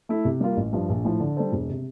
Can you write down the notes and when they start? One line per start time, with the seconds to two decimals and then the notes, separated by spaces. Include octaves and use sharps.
0.09 A3 E4
0.25 C3
0.41 G3 A#3 F4 A#4
0.57 A1
0.73 G2 F3
0.89 A#1
1.05 A2 F3
1.20 D3
1.37 G3 D4 A4 C5
1.52 E1
1.70 C3